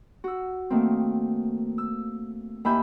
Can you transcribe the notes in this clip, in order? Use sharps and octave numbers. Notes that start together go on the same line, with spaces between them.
F#4 E6
D#3 A3 A#3 C4
E6
D#2 E4 E5 G#5 B5 G6